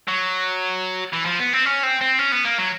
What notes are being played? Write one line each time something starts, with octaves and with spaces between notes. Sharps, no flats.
F#3
E3
F3
B3
C4
C#4
C4
C4
C#4
B3
A#3
F#3